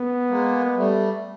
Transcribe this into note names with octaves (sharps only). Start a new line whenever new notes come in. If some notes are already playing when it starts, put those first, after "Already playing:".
Already playing: B3
G#3 A#3
G3 A3